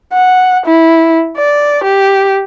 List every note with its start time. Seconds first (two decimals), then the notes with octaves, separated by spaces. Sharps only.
0.13 F#5
0.66 E4
1.37 D5
1.84 G4